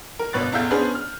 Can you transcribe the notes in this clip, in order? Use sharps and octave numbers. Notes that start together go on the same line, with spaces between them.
A#4
G1 B2 B4 C#5 F#6 A6
A1 E2 A3 F5 E6 G6
B3 C#4 D4 G#4 B4 C5
F6